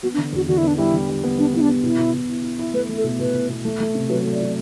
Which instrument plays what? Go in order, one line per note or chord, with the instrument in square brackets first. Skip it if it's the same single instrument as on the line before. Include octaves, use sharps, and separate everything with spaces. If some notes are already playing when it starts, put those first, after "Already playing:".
[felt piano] B3 [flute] F#4
[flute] D4
[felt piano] D3
[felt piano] E2 [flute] F#4
[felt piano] D3 [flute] F#4
[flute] E4
[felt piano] B3 [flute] D4
[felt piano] G3 [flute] E4
[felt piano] D3
G3
B3
[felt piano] B3 [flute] D4
[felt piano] B3 [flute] E4
[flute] D4
[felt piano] B3
[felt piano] B2 [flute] E4
[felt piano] B2
B2
E4
E4
E4
[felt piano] A3 [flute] B4
[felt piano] A3
[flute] A4
[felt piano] B2
[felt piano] B2 [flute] B4
[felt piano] B2
B2
A3
A3
C3
[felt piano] F#3 [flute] B4
[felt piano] A3
[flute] D5
[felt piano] F#3